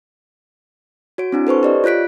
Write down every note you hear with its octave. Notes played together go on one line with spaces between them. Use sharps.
F#4 C#5 D7
C4 D4 E4
A4 B4 C5 C#6
G4 D5 D#5
F4 C#5 F#6 B6 D7